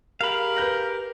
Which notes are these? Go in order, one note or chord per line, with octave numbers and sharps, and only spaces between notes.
G4 G#4 A#4 F5 B5
B4 G6 A#6